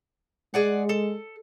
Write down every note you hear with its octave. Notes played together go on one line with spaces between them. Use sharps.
G#3 G#4 D5 F#5
A4